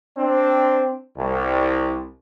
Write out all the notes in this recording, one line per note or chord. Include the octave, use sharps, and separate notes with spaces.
C4 D4
C2